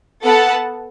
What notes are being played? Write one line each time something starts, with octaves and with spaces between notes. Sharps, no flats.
B3 A4 F#5 A5